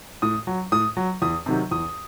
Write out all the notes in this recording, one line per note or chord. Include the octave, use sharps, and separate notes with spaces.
A2 D#6
F#3
A2 D#6
F#3
E2 D#6
C3 D#3 F#3
E2 D#6